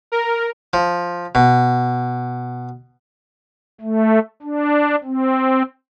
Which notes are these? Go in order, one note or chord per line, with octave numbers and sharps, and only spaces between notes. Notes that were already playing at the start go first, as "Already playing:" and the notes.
A#4
F3
B2
A3
D4
C4